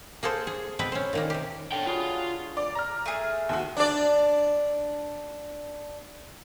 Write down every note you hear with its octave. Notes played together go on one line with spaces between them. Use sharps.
A#3 G#4 A4 C5
G#4
B2 B3 C4 B4 G5
C#4 C5
A#2 D#3 A#3
C3 G4
D3 A4 C#5 G5
F4 F#4 G#4 B4
D5
A#5 F6
A3 G#4
D#2 F#4
D4 D5